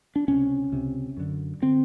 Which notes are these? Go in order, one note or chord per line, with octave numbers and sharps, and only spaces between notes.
D4
C#2 C3 C#4
C#2 C3
F#2 D3
D3 C4